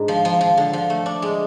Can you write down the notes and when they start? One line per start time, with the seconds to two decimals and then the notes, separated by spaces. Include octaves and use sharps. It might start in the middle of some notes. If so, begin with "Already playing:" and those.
Already playing: G#2 D4 G#4
0.08 F3
0.25 F3
0.41 F3
0.57 D3
0.73 F3
0.90 A3
1.06 D4
1.22 G#3